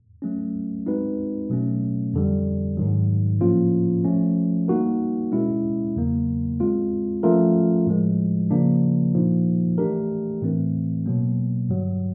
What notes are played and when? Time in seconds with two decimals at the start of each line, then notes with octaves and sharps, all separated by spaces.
0.22 F#3 A3 C#4
0.86 G#3 C4 D#4 F#4 B4
1.50 B2 F#3 A3 C#4
2.14 F2 D3 G3
2.77 G#2 D#3 F#3
3.41 A2 F3 A#3 C#4 F4
4.04 F3 A3 C#4
4.68 G3 A#3 D#4 F#4 A#4
5.32 B2 G#3 C#4 E4
5.96 E2 C#3 F#3 A#3
6.60 G#3 C4 F4
7.23 F3 A3 C#4 F4 A#4
7.87 A2 F3 G#3
8.51 C#3 F3 A#3 D4
9.14 A#2 F3 A#3 D#4
9.78 E3 A3 D4 G4 A#4
10.42 A2 E3 A3 C4
11.06 B2 F#3 A#3
11.69 G2 D3 F#3